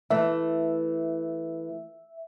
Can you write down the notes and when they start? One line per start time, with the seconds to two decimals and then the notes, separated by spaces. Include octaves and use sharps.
0.10 E3 A3 E5